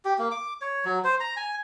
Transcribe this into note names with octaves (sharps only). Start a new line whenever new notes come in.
G4
A#3
D6
C#5
F#3
C5
A#5
G#5